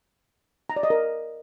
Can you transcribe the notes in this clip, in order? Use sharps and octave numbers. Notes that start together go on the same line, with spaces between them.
A#5
D5
D#5
A#4